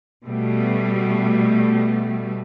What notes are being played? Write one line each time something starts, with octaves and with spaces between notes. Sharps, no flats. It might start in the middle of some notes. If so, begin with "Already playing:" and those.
B2 G3 A3